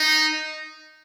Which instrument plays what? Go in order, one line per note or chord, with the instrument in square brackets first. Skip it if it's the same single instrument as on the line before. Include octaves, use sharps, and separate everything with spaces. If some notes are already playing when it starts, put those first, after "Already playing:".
Already playing: [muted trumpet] D#4